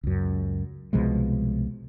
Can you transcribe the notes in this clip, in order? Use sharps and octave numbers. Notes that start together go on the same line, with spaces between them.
C#2 F#2
C2 B2 F3 G#3